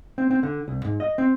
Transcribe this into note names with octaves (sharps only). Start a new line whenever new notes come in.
C4
C4
D3
C2
G#2
D#5
C4